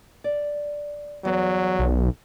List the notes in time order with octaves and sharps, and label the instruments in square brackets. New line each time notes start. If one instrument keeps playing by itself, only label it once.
[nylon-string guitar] D5
[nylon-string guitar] E2 G2 [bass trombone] F#3
[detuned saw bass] B1